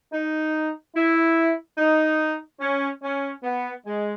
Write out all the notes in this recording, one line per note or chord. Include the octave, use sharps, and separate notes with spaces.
D#4
E4
D#4
C#4
C#4
B3
G#3